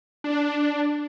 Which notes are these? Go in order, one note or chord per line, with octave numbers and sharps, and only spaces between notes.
D4